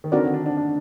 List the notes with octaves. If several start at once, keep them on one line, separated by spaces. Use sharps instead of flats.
D#3
D3 C4 D#4 F#4 A#4 D5
D#3
D4
D4
D4